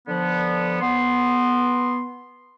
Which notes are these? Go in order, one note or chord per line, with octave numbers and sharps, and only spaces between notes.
D3 F3 B3
B3 C6